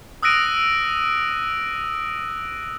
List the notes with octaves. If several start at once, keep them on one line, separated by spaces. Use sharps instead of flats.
D#6 E6 F#6 A#6 D7 D#7